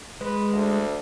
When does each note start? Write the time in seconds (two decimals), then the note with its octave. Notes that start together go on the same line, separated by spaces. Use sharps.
0.21 G#3 B4
0.53 D2